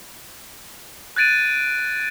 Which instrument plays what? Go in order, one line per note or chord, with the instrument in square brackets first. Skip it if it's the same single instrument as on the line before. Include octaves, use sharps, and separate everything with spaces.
[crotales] F#6 G#6 A6 D7 D#7